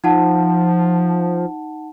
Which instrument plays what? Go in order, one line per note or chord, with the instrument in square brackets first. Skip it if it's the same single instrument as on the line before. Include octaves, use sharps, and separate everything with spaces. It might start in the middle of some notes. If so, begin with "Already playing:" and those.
[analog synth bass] F3 [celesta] D#4 F#5 A5